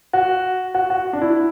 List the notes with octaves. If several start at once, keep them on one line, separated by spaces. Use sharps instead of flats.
F#4
F#4
F#4
D4
E4